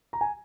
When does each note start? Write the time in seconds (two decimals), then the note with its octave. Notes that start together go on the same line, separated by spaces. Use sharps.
0.13 A#5
0.21 G#5